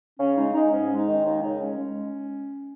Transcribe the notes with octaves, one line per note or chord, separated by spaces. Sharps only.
C#3 C#4
G#3 D#4
G#3 D#4
G#2 C#4
G#3
D#4
D#3
D#2 D#4
C#3 D#4
G#3 C#4
G#3